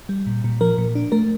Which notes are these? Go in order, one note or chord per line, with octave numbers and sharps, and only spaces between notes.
G3
A#2
A#2
F3 A#4
A#2
D4
A3 A#4